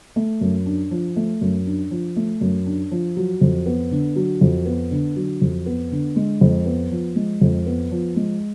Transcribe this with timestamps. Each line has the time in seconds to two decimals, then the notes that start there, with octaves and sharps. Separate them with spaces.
0.16 A3
0.41 F#2
0.66 D4
0.91 F3
1.16 A3
1.41 F#2
1.66 D4
1.91 F3
2.16 A3
2.41 F#2
2.66 D4
2.91 F3
3.17 F#3
3.41 F2
3.66 B3
3.91 D3
4.16 F#3
4.41 F2
4.66 B3
4.91 D3
5.16 F#3
5.42 F2
5.66 B3
5.91 D3
6.16 G#3
6.41 F2
6.66 B3
6.91 F3
7.16 G#3
7.41 F2
7.67 B3
7.91 F3
8.16 G#3